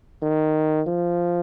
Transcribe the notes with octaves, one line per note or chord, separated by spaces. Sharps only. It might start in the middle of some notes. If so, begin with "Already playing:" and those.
D#3
F3